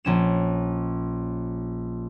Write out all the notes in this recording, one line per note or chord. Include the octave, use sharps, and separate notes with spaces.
A#1 C#4 E7